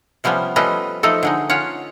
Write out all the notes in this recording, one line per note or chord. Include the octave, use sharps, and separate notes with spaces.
C3 F3 G3 B3 C#4
F3 G3 A3 C#4 B4 D#5
F3 A3 D#4 A4
D3 G#3 D#4
C#4 F4 C#5 F#5